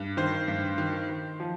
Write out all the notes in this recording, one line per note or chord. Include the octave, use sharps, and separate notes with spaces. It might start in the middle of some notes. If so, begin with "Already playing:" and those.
Already playing: G2
D#3 C5
G2
D#3
D#3
F3